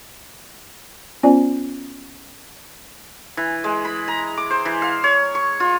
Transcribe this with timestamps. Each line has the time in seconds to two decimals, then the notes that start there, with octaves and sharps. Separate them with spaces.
1.23 B3 C#4 F4 C5 D5 G#5
3.37 E3
3.64 G#3
3.85 B5
4.08 A#5
4.37 D6
4.51 C5
4.65 E3
4.82 F5
5.04 C#5
5.35 C#6
5.60 F4